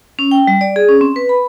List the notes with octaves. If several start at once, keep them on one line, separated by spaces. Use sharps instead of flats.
C#4
G5
G3
D5
G#4
C#4
C4
B4
B5